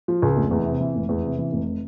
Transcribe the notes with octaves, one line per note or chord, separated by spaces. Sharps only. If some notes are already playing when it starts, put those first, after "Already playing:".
F3
C#2
F1
E2
C3
E3
F1
E2
C3
E3
F1